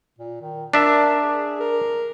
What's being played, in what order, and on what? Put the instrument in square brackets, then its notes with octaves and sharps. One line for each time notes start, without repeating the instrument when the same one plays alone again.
[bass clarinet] A#2
D#3
[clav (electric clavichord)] D4 E5 [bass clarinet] A#4
[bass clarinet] G#4
A#4